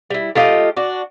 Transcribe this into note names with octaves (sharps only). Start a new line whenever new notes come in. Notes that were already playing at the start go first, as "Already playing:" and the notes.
G3 E4
A3 F4 G4 D#5
D4 F#4